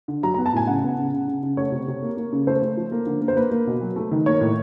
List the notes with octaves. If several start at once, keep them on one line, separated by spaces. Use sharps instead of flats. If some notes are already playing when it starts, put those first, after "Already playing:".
D3
F#3 A#5
B3 A#5
A5
A2 G#5
C#3 F#5
B3
C#3
C#3
C#3
C#3
A3 C#5
C3
C3
A#3
A#3
C#3
A3 C5
A3
F3
A#3
D3
A#3
C5
A#3 B4
A#3
B2
F#3
A3
D#3
A#3 C#5
A2